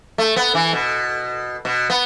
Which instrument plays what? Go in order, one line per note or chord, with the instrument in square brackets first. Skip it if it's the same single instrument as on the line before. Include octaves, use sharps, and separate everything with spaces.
[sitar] A3
B3
E3
B2
B2
B3